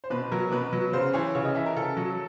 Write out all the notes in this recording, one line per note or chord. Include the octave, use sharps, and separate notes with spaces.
C5
B2 B4
F#3 A#4
B2 B4
F#3
C#3 C5
E3 C#5
C#3 C#5
D#5
E3 E5
A#4
C#3 A4
F#3